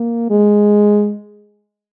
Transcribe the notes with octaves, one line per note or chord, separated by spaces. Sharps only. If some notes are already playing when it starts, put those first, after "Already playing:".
Already playing: A#3
G#3